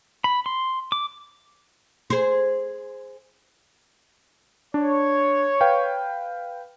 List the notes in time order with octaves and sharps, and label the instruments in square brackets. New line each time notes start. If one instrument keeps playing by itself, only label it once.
[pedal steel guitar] B5
C6
D6
[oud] G#4 C5
[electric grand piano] D4 [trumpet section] C#5
[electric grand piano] B4 F5 G5